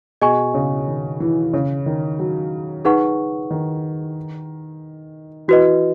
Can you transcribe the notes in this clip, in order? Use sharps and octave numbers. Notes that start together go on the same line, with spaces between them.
B2 G#4 D#5 G#5 C#6
C#3
D#3
E3
C#3
D#3
F#3
D#4 G#4 B4 F#5 C#6
D#3
E3 F#4 B4 D#5